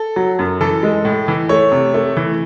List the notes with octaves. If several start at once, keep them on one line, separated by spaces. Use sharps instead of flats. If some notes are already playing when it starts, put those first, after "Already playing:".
Already playing: A4
F#3
F#2
E3 A4
G#3
A2
E3
A3 C#5
C3
A3
E3